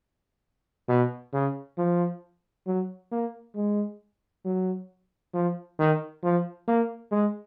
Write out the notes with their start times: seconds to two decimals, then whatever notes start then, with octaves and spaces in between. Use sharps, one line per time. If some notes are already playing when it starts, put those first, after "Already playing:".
0.89 B2
1.33 C#3
1.78 F3
2.67 F#3
3.12 A#3
3.56 G#3
4.45 F#3
5.34 F3
5.79 D#3
6.23 F3
6.68 A#3
7.12 G#3